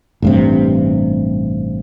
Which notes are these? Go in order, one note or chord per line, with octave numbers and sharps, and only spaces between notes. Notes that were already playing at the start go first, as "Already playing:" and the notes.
A1 G2 C3